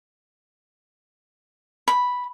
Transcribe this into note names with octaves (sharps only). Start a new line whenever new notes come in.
B5